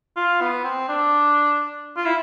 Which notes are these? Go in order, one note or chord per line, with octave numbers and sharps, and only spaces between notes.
F4
B3
C4
D4
F4
E4